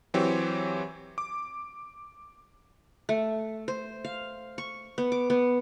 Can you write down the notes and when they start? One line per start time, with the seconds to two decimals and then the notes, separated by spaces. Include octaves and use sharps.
0.14 E3 F#3 C4 G4 C#5
1.18 D6
3.09 A3
3.68 C5
4.05 F5
4.58 C#6
4.98 B3
5.12 D6
5.30 B3